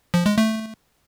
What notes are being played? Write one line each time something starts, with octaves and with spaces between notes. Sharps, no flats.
F3
G#3
A3